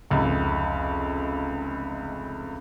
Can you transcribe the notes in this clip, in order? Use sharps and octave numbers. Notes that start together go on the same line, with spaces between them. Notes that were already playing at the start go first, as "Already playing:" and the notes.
F1 C#2 C3